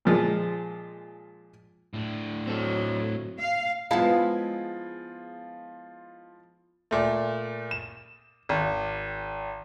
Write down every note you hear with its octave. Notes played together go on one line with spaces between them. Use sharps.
A#2 F3 G#3
A2 D4
F#3 C4 A4
F5
F3 G#3 B3 E4 F4 F5 A5
A#2 A3
E7
G#1